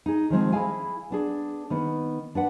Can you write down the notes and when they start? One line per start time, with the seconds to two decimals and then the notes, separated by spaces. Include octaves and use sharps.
0.06 D#4 G#4
0.30 D#3 F3 G#3 C4
0.52 E4 G#4 D#5 F5 G#5
1.10 B3 D4 G#4
1.70 D#3 B3
2.35 D4 B4 F#5